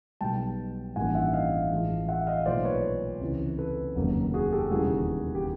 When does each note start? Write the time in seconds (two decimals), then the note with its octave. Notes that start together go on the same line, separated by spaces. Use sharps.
0.21 B1 B2 G3 G5 A5
0.96 A1 G2 D#3 G3 A#3 F#5 G#5
1.15 E5 F#5
1.34 D#5 F5
1.71 A1 A2 F3 G#3
2.08 E5 F#5
2.27 D#5 F5
2.46 B1 A#2 F3 A3 C5 D5
2.65 B4 C#5
3.21 C#2 C3 E3
3.58 A4 B4
3.96 F1 D#2 C#3 F#3 A#3
4.34 F#4 G#4
4.52 G4 A4
4.71 E1 D#2 C#3 E3 G3 F#4 G#4
5.35 G4